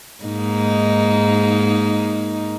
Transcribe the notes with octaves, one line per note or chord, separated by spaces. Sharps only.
G#2 A#3 D#4